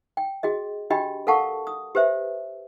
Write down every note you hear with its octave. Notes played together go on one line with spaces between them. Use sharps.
G5
F#4 G#4 D#5
D4 F#4 G4 D#5 G5 B5
A4 A#4 F5 F#5 A5 C#6
D#6
G4 B4 C5 E5